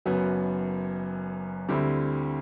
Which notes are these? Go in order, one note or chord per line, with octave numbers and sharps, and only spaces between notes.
F#1 F#2 F#3 B3
D2 D3 G3 C4 E4